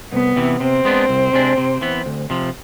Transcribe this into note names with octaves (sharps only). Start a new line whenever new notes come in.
C2 B3
C3 E3
C3 C4
G#3 B3 D4
C2
C3 G#3 D4
C3
E3 B3
D2
C3 F3